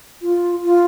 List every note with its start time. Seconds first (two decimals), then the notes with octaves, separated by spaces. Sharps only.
0.22 F4
0.64 F4